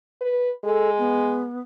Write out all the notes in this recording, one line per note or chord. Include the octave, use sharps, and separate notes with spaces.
B4
G#3 A4
B3